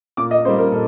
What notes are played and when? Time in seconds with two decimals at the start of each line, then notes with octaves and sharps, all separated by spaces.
0.17 A#2 D6
0.31 D#5
0.45 G3 A#3 C5
0.59 A#4
0.72 A#2 A4